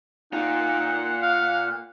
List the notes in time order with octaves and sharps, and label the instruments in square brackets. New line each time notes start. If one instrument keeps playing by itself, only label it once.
[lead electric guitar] A#2 F4 [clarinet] D#4 [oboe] F#5
[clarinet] F5